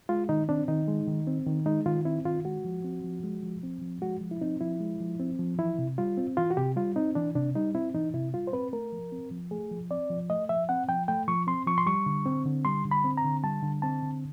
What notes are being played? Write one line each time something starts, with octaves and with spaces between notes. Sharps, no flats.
G#3 F4
D#3 D#4
C4 D4
D#3 D#4
G#3
D#3
C4
D#3
G#3 D#4
D#3 F4
C4 E4
D#3 F4
G#3 F#4
F3
C4
F3
G#3
F3
C4
F3
G#3 F#4
F3
E4
C4 D#4
F3 E4
G#3
F3
C4
F3
E3 E4
C3
G3 F4
C4
E3 F4
F#4
C3 G4
G3 F4
C4 D#4
E3 D4
C3 D4
G3 D#4
C4 E4
E3 D#4
C3 E4
G3 F4
C5
C4 B4
A3 A#4
F3
C4
F3
A3 G#4
F3
C4 D5
F3
A3 D#5
F3 E5
C4 F#5
F3 G5
A3 G5
F3 C#6
C4 C6
F3 C#6
C6
G3 C#6
D3
C4
D3
G3 C6
D3
B5
C4
A#5
D3
G3 A5
D3
C4 A5
D3